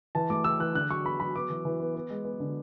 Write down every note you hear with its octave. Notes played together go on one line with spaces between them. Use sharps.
E3 A5
A3 D6
E3 E6
E3 F#6
D3 F#6
F#3 C#6
B3 B5
F#3 B5
B3 D6
E3
E3
B3
B3
G#3
B3
D3